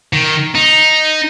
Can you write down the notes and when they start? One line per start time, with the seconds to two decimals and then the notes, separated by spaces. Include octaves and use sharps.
0.13 D#3
0.55 D#4